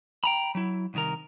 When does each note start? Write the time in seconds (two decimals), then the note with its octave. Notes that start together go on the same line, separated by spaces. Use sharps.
0.24 G5 A#5 B5
0.55 F#3 E4
0.94 C2 D#3 A#4